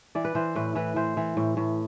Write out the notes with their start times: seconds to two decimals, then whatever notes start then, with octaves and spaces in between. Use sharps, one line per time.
0.15 E3 D5
0.25 B4
0.35 E3 C5
0.56 A2 B4
0.75 E3 B4
0.96 E3 C5
1.17 E3
1.37 A2
1.57 A2